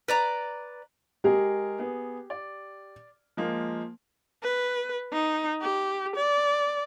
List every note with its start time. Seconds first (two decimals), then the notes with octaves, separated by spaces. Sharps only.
0.08 B4 D5 A#5
1.24 G#3 G4 G#4 A#4
1.79 B3 G#4
2.30 D5
3.37 F3 G#3 A#3
4.43 B4
5.12 D#4
5.62 G4
6.16 D5